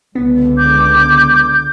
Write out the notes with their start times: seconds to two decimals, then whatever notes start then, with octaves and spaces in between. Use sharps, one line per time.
0.15 C#2 D3 B3
0.57 D6 G6